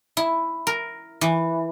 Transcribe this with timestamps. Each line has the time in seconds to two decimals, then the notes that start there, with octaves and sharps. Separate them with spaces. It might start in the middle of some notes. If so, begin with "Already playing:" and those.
0.17 E4
0.67 A#4
1.21 E3